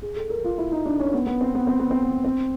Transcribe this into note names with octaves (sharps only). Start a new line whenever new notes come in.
G#4
A4
A#4
F4
E4
D#4
D4
C#4
B3
B3
C4
B3
C4
B3
C4
B3
C4